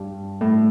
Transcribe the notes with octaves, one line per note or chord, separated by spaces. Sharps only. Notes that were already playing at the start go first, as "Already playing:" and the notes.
Already playing: G2
A2